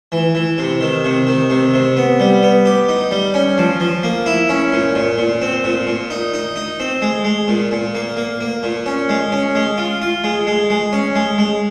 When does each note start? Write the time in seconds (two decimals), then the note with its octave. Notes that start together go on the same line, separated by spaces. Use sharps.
0.12 E3
0.35 E3
0.58 C3
0.81 D#3
1.04 C3
1.27 D#3
1.50 C3
1.74 C3
1.97 B3
2.20 G3
2.43 B3
2.65 G4
2.89 D#4
3.11 G3
3.34 C#4
3.58 F3
3.80 F3
4.03 A#3
4.26 E4
4.49 C#4
4.72 A#2
4.95 A#2
5.18 A#2
5.41 C4
5.64 A#2
5.87 A#2
6.10 D#4
6.34 D#4
6.56 D#4
6.80 C4
7.02 G#3
7.25 G#3
7.48 A#2
7.71 A#2
7.95 A#3
8.17 A#3
8.40 A#3
8.63 A#2
8.86 C#4
9.09 G#3
9.32 C#4
9.55 G#3
9.78 F4
10.02 F4
10.24 G#3
10.47 G#3
10.70 G#3
10.93 C#4
11.15 G#3
11.38 G#3